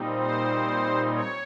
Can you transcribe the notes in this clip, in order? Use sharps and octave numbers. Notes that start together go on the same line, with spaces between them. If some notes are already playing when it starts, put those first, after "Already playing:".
Already playing: A#2 G3 C4 D#4
C5
C#5